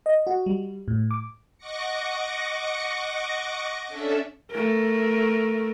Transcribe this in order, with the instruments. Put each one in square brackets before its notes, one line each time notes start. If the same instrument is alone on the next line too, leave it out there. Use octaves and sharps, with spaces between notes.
[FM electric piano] D#5
F#4
G3
A2
D6
[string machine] D#5 F#5 C#6 D6 A#6 C#7
C#4 D4 A4 E5
[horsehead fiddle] A3 A#4